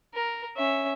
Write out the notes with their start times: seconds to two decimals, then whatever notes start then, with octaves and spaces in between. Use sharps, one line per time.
0.15 A#4
0.57 C#4 E5